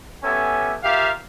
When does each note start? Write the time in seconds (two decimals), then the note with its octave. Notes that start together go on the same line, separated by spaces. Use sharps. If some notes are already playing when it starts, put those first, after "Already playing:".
0.23 B3 C#4 G4 A4 E5 G#5
0.83 F4 G4 A#4 E5 F5